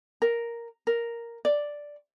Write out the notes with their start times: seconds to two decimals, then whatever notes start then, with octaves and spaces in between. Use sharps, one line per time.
0.22 A#4
0.87 A#4
1.45 D5